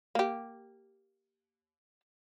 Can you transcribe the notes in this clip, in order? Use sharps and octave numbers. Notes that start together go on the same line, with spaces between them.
A#3 G4